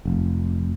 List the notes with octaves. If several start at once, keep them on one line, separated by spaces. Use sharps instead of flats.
F1